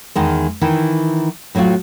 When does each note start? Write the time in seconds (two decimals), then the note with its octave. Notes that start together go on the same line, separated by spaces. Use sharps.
0.15 E2 D#3 G#3
0.61 D#3 E3 E4
1.55 A2 F#3 C4 F4 F#4